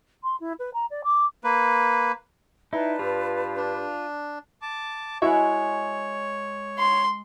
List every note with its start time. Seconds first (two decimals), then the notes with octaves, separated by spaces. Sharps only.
0.23 C6
0.40 E4
0.59 B4
0.74 A#5
0.91 D5
1.04 D6
1.44 A#3 B4
2.73 D#4 E4 B4 D5 A5
2.99 G2 F4
3.57 D4
4.62 A5 D6
5.22 G#3 E4 F#4 C#5 E5
6.79 C6